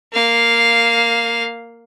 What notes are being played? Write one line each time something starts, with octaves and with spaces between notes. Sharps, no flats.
A#3 F5